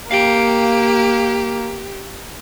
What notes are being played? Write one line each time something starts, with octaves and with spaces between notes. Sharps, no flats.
A#3 G4 F5 G5